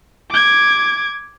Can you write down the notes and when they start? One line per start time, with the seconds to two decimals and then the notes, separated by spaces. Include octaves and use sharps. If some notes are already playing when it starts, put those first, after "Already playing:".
0.31 D6 G#6